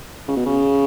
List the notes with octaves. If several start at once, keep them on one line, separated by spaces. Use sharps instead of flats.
C#3
B2
C#3